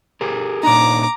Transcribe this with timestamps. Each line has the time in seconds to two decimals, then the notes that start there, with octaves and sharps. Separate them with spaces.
0.21 G4 G#4 A#4
0.63 A#2 D4 D#4 A#5 D6